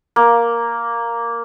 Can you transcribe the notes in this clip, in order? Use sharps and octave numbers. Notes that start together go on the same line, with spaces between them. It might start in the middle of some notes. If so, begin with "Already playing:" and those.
A#3